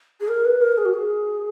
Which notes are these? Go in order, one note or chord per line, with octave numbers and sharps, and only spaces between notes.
G#4
A#4
B4
A#4
G#4
F#4
G#4